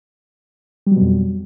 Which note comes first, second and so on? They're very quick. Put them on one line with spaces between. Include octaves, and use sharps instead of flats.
G3 F#3 B2 F2